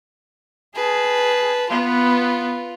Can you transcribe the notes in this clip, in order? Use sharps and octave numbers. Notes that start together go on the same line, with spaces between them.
G#4 B4 A5
B3 F4 B4